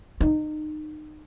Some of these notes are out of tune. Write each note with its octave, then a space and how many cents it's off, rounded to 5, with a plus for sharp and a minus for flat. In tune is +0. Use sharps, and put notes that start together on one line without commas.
D#4 -30